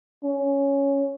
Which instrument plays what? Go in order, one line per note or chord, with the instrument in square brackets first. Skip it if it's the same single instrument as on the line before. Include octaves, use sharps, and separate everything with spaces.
[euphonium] C#4